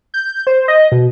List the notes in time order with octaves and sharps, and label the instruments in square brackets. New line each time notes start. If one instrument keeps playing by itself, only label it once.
[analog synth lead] G6
C5
D#5
B2